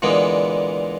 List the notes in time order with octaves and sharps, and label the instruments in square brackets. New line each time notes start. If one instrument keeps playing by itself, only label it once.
[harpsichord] A#2 D3 E3 G#3 B3